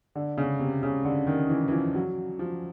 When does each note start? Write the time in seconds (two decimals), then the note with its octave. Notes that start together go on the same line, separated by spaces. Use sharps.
0.15 D3
0.38 C#3
0.60 C3
0.83 C#3
1.05 D3
1.27 D#3
1.49 E3
1.68 E3
1.72 F3
1.95 F#3
2.39 F3